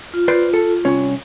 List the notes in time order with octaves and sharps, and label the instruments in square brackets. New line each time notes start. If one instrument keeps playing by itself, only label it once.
[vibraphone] F4
[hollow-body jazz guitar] B4 C5 D5
A4
C2 C#4 C#5